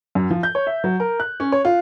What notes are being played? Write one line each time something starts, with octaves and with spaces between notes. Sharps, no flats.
F#2
F3
G6
C#5
E5
F#3
A#4
F#6
C#4
C#5
F4